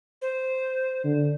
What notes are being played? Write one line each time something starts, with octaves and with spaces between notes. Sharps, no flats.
C5
D3